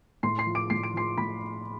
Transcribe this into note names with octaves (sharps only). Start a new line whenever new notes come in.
A2 C6 C7
C6 C7
F3
D6 D7
A2 C7
D7
F3 C6 C7
A2 B5 B6